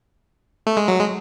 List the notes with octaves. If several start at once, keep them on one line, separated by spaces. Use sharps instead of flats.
A3
G#3
F#3
G#3